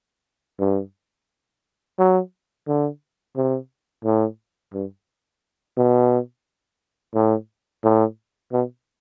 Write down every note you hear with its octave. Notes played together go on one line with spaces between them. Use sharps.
G2
F#3
D3
C3
A2
G2
B2
A2
A2
B2